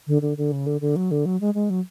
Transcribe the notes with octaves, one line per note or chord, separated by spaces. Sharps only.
D3
D3
D3
C#3
D3
D3
F#3
D3
F#3
G#3
G#3
F#3